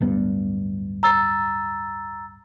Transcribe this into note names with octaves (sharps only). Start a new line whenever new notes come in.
D1 G2 B3
A#5 E6 A6